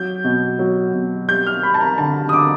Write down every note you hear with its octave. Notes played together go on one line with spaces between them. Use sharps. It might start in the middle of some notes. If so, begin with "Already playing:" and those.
Already playing: F#3 G6
B2
F#3
B2
G3 G6
F6
G3 B5
A5
A#5
D3 A5
D#6
D3 D6